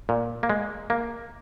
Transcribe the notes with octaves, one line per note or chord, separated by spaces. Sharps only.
A#2
A#3
G#3
A#3